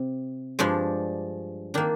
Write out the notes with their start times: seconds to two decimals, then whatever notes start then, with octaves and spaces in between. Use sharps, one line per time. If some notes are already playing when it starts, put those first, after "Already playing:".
Already playing: C3
0.59 G2 F3 G#3 D4
1.74 D#3 A#3 D4